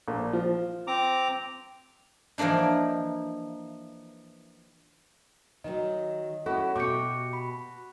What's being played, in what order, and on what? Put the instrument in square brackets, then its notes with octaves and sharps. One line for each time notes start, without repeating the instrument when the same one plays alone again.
[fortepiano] A#1
F3
[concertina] C4 A#5 D6
[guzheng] E3 F3 A#3 D4 D#4
[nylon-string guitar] D#3 E3 F#3 [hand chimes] D#5
[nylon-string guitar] C#4 E4 [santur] F#4 [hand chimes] A4
[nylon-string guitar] B2 G4 [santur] C#6 [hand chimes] D6 G6 C#7
[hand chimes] B5